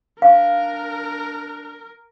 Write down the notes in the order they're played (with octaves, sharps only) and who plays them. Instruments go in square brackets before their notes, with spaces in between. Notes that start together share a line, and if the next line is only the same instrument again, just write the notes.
[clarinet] D4 [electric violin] A#4 [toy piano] F5